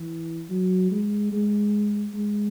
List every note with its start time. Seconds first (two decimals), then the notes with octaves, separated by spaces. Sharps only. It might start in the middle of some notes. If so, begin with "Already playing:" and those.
Already playing: E3
0.50 F#3
0.91 G#3
1.32 G#3
2.14 G#3